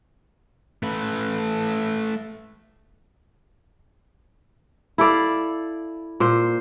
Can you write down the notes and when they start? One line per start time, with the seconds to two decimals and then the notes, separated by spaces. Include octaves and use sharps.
0.83 A3 B4
4.98 E4 A4 D5 F5
6.20 A#2 C5